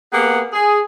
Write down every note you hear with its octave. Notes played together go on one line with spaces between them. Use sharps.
A#3 B3 G4 G#4 F#5
G#4